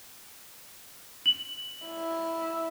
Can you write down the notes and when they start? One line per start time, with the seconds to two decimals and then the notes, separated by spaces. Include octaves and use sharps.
1.26 F#7
1.87 E4